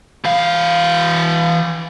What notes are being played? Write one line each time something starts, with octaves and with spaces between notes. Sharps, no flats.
E3 F5